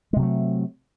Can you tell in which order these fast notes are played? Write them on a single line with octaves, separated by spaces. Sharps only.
G#3 C3 F#3 A3